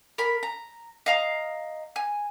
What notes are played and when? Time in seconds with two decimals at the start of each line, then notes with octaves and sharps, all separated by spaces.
0.18 A#4 B5
0.43 A#5
1.06 D#5 F5 A#5
1.96 G#5